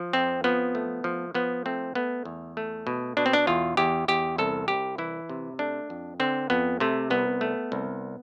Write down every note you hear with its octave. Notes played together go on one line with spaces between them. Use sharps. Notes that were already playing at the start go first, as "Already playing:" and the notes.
Already playing: F3
F2 C4
F3 B3
A3
F3
F3 B3
A3 C4
A3 B3
E2
A3
B2
B2 D4
C4
D4
E2 F4
E2 G4
E2 G4
C2 A4
C2 G4
E3 E4
C3
A3 D4
F2
D3 C4
F2 B3
C3 A3
C2 B3
A3
C2